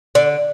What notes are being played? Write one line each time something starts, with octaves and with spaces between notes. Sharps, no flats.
D3 D5